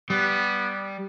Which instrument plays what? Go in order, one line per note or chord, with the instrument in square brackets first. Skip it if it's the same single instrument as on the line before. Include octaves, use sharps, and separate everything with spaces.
[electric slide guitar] G3 [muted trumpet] B3